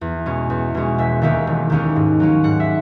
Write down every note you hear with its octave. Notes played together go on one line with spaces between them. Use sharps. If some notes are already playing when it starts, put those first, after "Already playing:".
E2
B2 G#3 C#4
E2
B2 G#3 C#4
E1 E5
D#2 D#3 A#3 C#4 E5
E1
D#2 D#3 A#3 C#4
G#2
F#3 A#3 C#4
G#2 F#5
E5